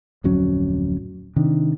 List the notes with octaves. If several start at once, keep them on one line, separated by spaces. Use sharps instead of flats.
D1 F2 F#3 C#4
C3 D#3 D4